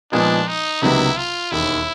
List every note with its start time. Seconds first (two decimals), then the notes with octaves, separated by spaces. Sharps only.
0.12 A#2 F3 G#3 B3 D4 D#4
0.47 D#4
0.82 C#2 C3 D#3 F#3 B3 E4
1.17 F4
1.51 E1 D#2 D#3 E4